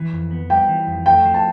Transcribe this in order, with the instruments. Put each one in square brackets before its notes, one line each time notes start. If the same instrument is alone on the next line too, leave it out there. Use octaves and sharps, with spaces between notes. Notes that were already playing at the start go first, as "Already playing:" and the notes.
Already playing: [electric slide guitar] E3
F2
B3
[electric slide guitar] G3 [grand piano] G5
[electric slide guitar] E3
F2
[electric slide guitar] A3 [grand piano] G5
[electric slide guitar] F3
[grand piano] A5